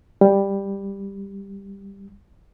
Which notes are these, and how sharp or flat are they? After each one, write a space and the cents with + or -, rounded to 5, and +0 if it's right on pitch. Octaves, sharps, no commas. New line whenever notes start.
G3 +10